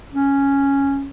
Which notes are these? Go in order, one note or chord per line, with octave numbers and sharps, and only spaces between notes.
C#4